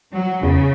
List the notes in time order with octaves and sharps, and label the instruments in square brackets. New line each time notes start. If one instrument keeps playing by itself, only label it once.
[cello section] F#3
[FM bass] E2 [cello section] C#3